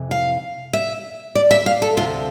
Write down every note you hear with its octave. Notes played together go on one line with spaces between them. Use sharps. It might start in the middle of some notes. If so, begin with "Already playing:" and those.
Already playing: F2 C3 E3
F5
E5
D5
E5
F5
A4
D2 C3 F3 F4